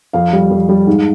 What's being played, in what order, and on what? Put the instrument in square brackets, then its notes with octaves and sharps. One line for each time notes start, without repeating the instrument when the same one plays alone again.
[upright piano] F2 F5
G3
F2
G3
G#2